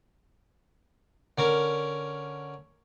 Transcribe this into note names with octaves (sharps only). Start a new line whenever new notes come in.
D3 C#4 A#4